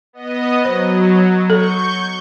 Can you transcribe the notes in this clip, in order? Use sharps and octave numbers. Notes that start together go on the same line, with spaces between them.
B3 D#5
F#3 C5
A4 C#6 G6